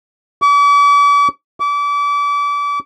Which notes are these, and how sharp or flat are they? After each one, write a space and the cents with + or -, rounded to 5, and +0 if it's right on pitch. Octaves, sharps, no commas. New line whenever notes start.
D6 -45
D6 -35